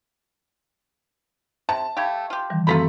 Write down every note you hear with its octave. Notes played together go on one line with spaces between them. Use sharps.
C3 A5
A3 G4 F5 B5 G#6
F4 G4
D#3 E3 G3
F#2 C3 A3 F4 A#5 B5 B6